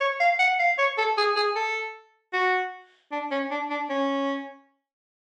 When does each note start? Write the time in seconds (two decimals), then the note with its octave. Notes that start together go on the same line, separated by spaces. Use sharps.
0.01 C#5
0.20 F5
0.39 F#5
0.59 F5
0.78 C#5
0.98 A4
1.18 G#4
1.36 G#4
1.55 A4
2.33 F#4
3.12 D4
3.31 C#4
3.51 D4
3.70 D4
3.89 C#4